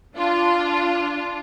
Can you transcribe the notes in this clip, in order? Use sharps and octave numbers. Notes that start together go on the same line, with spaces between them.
D4 F4